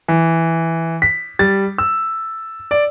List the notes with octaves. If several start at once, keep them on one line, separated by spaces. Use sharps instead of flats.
E3
B6
G3 A6
E6
D5